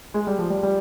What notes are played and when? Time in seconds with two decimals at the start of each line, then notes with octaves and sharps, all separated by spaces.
0.14 G#3
0.27 G3
0.39 F3
0.50 G3
0.63 G3